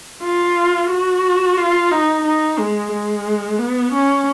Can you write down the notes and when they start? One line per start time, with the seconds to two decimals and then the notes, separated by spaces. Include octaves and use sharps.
0.23 F4
0.90 F#4
1.57 F4
1.91 D#4
2.25 D#4
2.58 G#3
2.92 G#3
3.58 B3
3.93 C#4